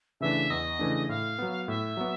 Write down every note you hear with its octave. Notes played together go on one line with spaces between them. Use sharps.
C#3 E3 A3 D4 E5
E2 D#5
C#3 E3 A3 D4
A2 F5
F#3 B3
A2 E5
F#3 B3